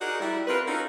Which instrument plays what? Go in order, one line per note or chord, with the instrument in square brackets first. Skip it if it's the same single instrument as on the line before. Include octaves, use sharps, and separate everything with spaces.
[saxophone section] D#4 F#4 G#4 A#4 D5 D#5
G3 E4
C4 F4 A#4 B4
C#4 D#4 F4 F#4 A4